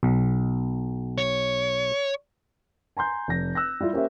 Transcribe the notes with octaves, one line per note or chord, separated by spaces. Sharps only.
B1
C#5
G#5 A#5 C6 G6
F1 A#6
E6 F#6 A#6
G3 E4 F4 G4
A#3 C#4 G4 C5 E5